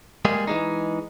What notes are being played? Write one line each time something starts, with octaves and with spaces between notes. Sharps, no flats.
G3 G#3 A#3 G#4
E3 G#3 D#4